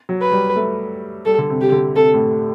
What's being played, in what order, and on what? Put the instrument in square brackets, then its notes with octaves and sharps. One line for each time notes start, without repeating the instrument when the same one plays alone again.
[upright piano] F#3
[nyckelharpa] B4
[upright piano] G3
A3
[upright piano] G3 [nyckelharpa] A4
[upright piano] D3
C3
[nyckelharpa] G4
[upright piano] D3
[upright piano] C3 [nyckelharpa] A4
[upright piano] A2